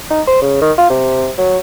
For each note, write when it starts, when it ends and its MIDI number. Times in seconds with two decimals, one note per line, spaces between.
0.10 0.22 63
0.27 0.40 72
0.42 0.59 49
0.62 0.72 51
0.78 0.85 65
0.90 1.31 48
1.38 1.58 54